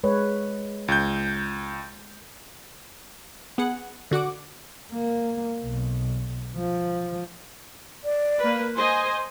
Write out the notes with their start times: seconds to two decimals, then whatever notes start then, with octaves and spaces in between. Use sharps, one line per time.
0.04 G#3 B4 C#5
0.88 C#2 G6
3.58 B3 G#4 F#5
4.11 D3 F#4 F#5 D6
4.92 A#3
5.65 B1
6.57 F3
8.04 D5
8.39 A#3 B4
8.75 C5 D#5 G#5 C6